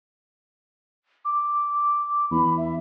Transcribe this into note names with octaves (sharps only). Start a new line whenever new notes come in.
D6
E2 B5
E5